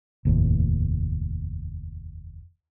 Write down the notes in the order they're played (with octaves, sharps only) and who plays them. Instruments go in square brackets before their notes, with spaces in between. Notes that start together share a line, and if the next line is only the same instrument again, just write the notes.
[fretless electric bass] F1 D#2 A2